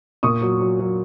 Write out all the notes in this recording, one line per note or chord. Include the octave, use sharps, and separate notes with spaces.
A#2 C#6 D#6
F#3
F#3
F#3